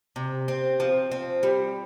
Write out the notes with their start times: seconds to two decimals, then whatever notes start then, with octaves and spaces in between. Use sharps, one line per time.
0.16 C3
0.48 C4
0.80 F3
1.12 C4
1.43 G3